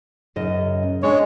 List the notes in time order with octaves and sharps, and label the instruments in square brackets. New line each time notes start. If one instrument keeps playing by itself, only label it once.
[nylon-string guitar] F#2 C#3 D#5
[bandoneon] G#3 [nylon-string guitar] D4 [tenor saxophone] C#5